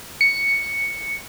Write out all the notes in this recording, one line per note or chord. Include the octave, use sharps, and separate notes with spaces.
C#7